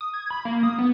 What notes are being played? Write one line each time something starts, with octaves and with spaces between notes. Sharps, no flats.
D#6
G#6
B5
A#3
D#6
B3